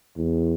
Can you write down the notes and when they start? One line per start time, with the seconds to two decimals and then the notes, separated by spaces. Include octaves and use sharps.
0.17 E2